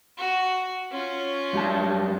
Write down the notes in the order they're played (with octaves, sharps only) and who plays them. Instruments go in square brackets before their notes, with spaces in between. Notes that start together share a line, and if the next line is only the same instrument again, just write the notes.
[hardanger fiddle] F#4
C#4 F4
[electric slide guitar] F#2 G3 A5